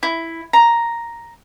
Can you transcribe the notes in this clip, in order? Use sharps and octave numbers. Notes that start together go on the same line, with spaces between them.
E4
A#5